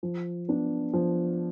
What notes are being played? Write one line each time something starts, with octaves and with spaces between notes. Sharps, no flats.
F3
B3 D4
F3